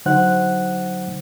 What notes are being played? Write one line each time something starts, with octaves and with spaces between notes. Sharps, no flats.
D3 F#3 D#4 C5 F#5 F#6